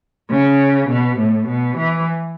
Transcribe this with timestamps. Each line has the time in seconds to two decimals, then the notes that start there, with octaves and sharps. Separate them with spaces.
0.30 C#3
0.89 B2
1.18 A2
1.48 B2
1.77 E3